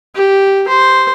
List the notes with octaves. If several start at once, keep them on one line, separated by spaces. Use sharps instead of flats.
G4
C5